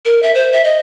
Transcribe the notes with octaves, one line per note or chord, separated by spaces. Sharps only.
A#4
E5
C5
E5
D#5